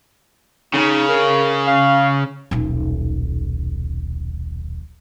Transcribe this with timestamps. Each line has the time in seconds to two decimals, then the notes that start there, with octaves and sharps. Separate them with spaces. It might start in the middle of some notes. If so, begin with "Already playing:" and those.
0.74 C#3 D#4
1.08 A#4
1.67 F5
2.51 D#1 B1